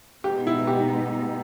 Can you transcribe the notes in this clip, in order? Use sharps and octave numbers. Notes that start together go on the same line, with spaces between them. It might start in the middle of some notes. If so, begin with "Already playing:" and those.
B2 G#3 B3 D#4 G4
E4
G4